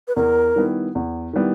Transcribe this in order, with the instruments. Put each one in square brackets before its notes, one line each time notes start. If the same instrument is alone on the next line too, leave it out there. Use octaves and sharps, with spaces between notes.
[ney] B4
[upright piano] E2 [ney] A#4
[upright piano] D#3 G3 B3 E4
E2
D#3 G3 B3 E4